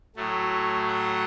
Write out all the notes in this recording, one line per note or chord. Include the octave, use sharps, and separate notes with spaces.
A2 F#3 A3
F#5